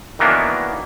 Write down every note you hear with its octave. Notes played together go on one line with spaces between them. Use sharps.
D#3 E3 F#3 A#3 B3 D4